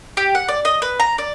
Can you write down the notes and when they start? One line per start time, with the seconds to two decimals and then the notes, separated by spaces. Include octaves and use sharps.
0.17 G4
0.35 F#5
0.48 D5
0.65 D#5
0.82 B4
1.00 A#5
1.18 D5